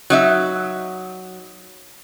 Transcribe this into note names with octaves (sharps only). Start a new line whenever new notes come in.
F#3 D#4 E5